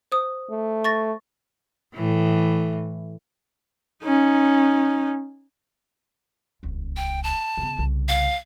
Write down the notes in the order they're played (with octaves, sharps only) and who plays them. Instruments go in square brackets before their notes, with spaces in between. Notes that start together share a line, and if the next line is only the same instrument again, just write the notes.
[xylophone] C5 D#6
[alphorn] A3
[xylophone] C#6 A6 A#6
[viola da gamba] A2 E3
[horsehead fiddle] C#4 D#4
[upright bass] D#1 C#2
[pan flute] G5
A5
[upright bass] C#3 B3
C2 C#3
[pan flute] F5